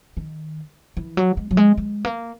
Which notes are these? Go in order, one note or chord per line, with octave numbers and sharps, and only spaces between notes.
D#3
E3
F#3
G#3
F#3
G#3
G#3
A#3